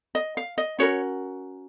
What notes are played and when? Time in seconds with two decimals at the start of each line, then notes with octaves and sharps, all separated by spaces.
0.15 D#5
0.37 F5
0.58 D#5
0.79 C#4 F#4 A#4 C#5